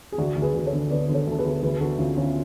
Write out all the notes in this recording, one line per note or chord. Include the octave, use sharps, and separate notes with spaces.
G#4
D2 D4 F#4
D2
G#4 B4
D2
A4 C#5
D3
D3 B4 D5
D3
A4 C#5
D2 A4
G#4 B4
D2
D2 G#4 B4
D3 F#4 A4
D2 C#4 F4
D3 C#4 F4